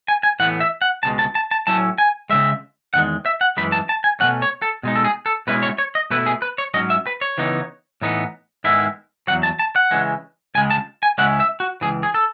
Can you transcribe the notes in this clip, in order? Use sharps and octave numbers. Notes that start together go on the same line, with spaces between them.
G#5
G#5
A2 E3 B3 F#5
E5
F#5
C#2 B2 G#3 A5
A5
A5
A5
A2 F#3 C#4 E4 A5
G#5
C#3 E3 G#3 E5
E2 D#3 G#3 F#5
E5
F#5
F#2 E3 G#3 B5
A5
A5
G#5
B2 F#3 A3 C#4 F#5
C#5
A4
B2 G#3 D#4
A4
G#4
A4
B2 G#3 C#4 E4 B4
C#5
C#5
D#5
B2 A3 E4 B4
G#4
B4
C#5
G#2 F#3 C#4 D#5
E5
B4
C#5
C#3 E3 B3 D#4
A2 E3 B3 D#4
G#2 D#3 G#3 B3 E4 E5
E2 B2 F#3 F#5
A5
A5
F#5
C#3 E3 G#3
C#2 C#3 G#3 G#5
A5
G#5
C#2 C#3 G#3 C#4 E4 F#5
E5
F#4
C#2 C#3 E3 G#4
G#4
A4